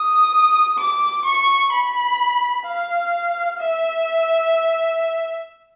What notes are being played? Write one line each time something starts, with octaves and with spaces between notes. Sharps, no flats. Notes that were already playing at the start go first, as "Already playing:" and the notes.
Already playing: D#6
D6
C#6
B5
F5
E5